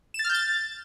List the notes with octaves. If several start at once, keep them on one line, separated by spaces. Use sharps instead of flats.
E7
A6
F6
G6
A6